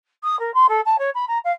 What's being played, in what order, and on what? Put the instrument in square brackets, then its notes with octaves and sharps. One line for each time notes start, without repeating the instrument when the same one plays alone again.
[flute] D#6
A#4
C6
A4
A5
C#5
B5
A#5
F5